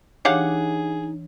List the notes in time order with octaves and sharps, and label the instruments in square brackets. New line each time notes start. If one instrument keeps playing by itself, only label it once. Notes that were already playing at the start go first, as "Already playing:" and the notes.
[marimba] E3 D4 C#5 [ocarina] D#4 [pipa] G4 F5 F#5 [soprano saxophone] G#4